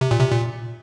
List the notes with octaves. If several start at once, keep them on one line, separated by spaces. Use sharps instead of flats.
C3
A#2
C3
A#2